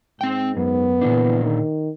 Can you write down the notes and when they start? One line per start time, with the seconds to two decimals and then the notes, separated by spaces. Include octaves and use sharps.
0.21 G#2 C4 G5
0.57 F#2 B3
1.01 A#2 D3 E3 D4
1.44 D#3